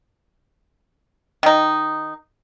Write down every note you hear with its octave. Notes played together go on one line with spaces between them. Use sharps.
D#3 D#4